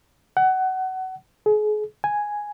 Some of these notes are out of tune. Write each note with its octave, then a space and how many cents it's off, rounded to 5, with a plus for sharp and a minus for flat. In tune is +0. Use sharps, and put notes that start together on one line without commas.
F#5 +25
G#4 +35
G#5 +0